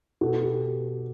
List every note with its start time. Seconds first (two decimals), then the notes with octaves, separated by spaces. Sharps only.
0.21 B2 F#4 A4
0.43 G4